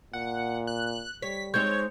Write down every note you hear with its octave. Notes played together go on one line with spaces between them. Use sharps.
A#2 F#5
F#6
G3 C#5 B6
G#3 C4 D#4 C#5 G6